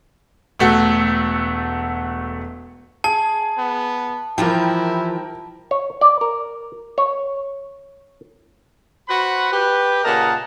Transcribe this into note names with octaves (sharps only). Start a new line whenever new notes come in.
E1 A3 F#4 A4
G#4 A5
B3
E3 F3 E4 G4 A#4 G5
C#5
D5
A#4
C#5
F#4 B4 C5 F#5 B5
G4 B4
A#2 C#3 A#4 D#5 F#5 A5